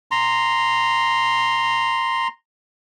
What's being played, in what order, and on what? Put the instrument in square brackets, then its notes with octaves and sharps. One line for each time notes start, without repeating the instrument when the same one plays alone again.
[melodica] A#5 C6